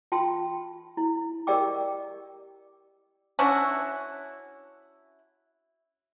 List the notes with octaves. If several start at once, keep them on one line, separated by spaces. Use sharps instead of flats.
F4 G5 A5 C6
E4
G4 A#4 D5 D#5 G5 D6
C#4 D4 E4 F#4